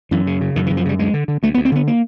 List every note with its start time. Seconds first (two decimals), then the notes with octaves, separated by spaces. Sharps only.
0.11 F#2 E3
0.27 C#3
0.41 C#3
0.56 F#2 D#3
0.66 E3
0.70 F#2
0.77 F3
0.85 C#3 G3
0.99 D2 G#3
1.14 D3
1.28 D3
1.43 D2 A3
1.54 B3
1.57 D2
1.65 C4
1.72 D3 B3
1.88 A#3